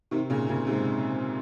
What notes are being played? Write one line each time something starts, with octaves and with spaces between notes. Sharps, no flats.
C3 D#3
A#2 C#3
A#2 C#3
G#2 C3